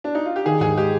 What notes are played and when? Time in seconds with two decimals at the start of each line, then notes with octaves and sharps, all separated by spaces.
0.04 D4
0.15 D#4
0.25 F4
0.36 G4
0.46 D#3 G#4
0.61 G#2 G#4
0.77 G#3 G4